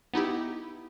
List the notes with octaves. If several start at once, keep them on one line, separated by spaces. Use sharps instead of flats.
B3 D#4 E4 G4